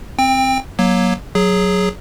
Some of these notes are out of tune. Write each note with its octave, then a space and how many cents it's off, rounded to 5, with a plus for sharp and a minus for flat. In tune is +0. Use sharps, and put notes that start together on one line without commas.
C4 +0 G5 +25
F#3 +0 A#3 +25
F#3 +0 G#4 +0